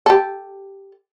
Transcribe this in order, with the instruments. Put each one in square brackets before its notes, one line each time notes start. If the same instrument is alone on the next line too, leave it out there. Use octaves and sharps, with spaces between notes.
[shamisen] G4 A4